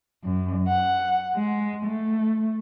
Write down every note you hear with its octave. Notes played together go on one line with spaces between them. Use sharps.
F#2
F#5
G#3
A3